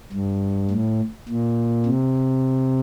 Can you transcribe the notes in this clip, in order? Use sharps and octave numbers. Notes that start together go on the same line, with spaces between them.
G2
A2
A#2
C3